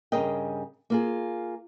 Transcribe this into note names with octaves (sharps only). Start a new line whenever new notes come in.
G2 C#3 G#4 A#4 D#5 G5
A#3 F4 G#4